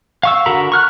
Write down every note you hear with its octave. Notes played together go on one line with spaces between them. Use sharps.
F5 C#6 E6
D3 F#4 A#4 A#5 B5
C#6 F6 F#6